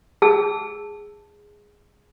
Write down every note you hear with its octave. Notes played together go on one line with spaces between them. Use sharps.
G#4 A5 E6